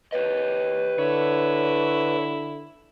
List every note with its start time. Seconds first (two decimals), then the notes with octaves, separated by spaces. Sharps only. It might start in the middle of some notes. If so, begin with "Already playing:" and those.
0.12 G4 B4 C#5 D#5
0.98 D3 E4 C#5